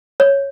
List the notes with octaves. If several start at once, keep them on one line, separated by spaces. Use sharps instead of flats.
C#5